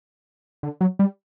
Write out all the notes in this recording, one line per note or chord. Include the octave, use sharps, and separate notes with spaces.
D3
F#3
G3